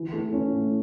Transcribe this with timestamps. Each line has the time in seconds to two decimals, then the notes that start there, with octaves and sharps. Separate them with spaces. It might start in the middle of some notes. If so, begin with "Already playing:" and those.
Already playing: E3
0.13 A3
0.32 C#4
0.52 A2